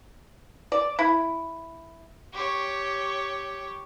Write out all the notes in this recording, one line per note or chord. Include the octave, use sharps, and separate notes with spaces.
D5
E4
G4 C#5